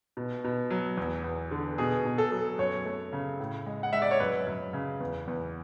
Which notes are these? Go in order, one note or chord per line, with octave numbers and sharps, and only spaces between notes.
B2
B2
F#3
E2
E2
D3
B2 G#4
B2
A4
F#3
F#2 C#5
A3
C#3
A2
G#3
F#5
G#3 E5
D5
C#5
F#2 B4
F#2
C#3
E2
E2